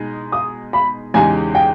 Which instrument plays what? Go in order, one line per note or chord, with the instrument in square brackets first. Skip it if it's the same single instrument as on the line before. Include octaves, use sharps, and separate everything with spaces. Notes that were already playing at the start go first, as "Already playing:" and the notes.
Already playing: [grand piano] B2 G#3 D#4
[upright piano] D#6
B5
[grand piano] E2 C#3 G#3 D#4 G4 [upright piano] G#5
[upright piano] G5